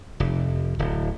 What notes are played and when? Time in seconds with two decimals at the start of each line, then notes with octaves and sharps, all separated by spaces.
0.20 F1
0.79 D1